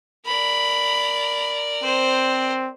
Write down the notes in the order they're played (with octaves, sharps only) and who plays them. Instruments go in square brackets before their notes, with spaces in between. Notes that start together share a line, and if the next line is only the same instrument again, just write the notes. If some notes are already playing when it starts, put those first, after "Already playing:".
[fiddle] A#4 D5 [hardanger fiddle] B5
[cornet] C4 [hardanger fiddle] C5